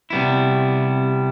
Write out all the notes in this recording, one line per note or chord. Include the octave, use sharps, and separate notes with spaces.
C3 G3 B3 E4